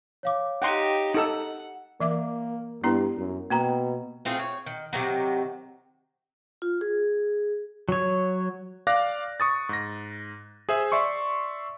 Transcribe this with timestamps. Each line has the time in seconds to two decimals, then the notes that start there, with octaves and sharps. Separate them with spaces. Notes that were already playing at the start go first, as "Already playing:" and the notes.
0.23 C#5 F5 D6
0.62 D#4 G4 F#5 G5 C6
1.15 D#4 A4 F#5 E6
2.00 E3 A#3 E5 D6
2.84 G2 B3 E4 A#5
3.17 F#2
3.50 B2 A#3 G5 A#5
4.25 A3 C4 F4 G#4
4.39 C#5
4.66 D#3
4.93 C3 D#3 F#3
6.62 F4
6.81 G#4
7.89 F#3 C#5
8.87 D5 F5 D6 F#6 A#6
9.40 C#6 D#6 A6
9.69 G#2 A#6
10.69 G#4 C5 E5
10.92 D5 E5 C6 C#6